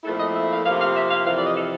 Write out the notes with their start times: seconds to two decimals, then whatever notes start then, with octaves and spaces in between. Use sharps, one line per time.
0.04 A#2 F3 A3 C4 E4 A4
0.20 D#5
0.34 E5
0.49 F5
0.64 C3 F3 A#3 F5
0.80 F5
0.96 E5
1.10 F5
1.25 F2 C3 E3 F5
1.36 D5
1.45 D#5
1.56 A4